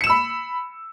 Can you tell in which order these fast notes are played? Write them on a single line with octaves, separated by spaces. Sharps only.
C#7 E7 E6 B5